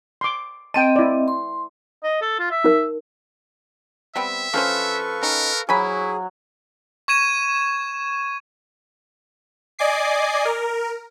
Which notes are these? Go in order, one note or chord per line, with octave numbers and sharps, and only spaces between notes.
C6 D6
C4 D#5 G5 A5
E4 D5
C6
D#5
A4
F4
E5
D#4 A#4
G3 B3 C4 E5
F3 C#4 A4 B4 C5 F5 C#6
C#4 D#4 A#4
F#3 E4 G#4 G#5 B5
C#6 G#6 D#7 E7
D5 D#5 G#5 D6 C7
A#4